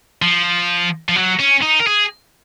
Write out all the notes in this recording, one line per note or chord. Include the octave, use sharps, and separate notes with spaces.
F3
F3
F#3
C#4
D#4
A#4
G#4